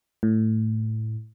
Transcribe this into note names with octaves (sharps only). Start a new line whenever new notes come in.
A2